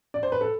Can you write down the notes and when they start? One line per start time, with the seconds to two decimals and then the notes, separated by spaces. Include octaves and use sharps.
0.14 D5
0.23 C5
0.32 B4
0.41 A4